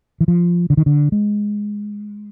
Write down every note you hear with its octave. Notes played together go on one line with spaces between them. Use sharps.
E3
F3
D3
D#3
D3
G#3